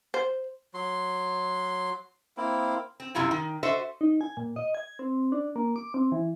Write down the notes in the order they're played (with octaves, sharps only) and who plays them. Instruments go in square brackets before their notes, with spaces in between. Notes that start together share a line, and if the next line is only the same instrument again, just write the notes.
[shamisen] C5
[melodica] F#3 C6
A#3 C4 E4
[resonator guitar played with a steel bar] C4
F#2 C3 G3 E4 F4
D#3
F#4 A4 C5 D#5 E5
[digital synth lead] D#4
G#5
A#2
D#5
G#6
C4
D4
A#3
D6
C4
E3